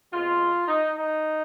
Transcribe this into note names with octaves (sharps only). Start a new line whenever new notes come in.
B2 G#3 C4 F4
D#4
D#4